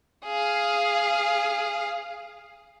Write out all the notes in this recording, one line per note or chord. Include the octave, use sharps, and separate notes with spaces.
G#4 F5